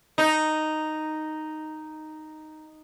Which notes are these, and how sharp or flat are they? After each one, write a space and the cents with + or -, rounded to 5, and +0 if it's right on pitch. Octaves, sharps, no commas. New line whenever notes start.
D#4 -5